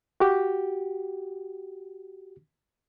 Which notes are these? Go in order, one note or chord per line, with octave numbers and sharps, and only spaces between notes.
F#4 G4